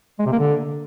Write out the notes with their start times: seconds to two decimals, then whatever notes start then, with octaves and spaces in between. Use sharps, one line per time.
0.19 G#3
0.26 C3
0.32 A#3
0.39 D3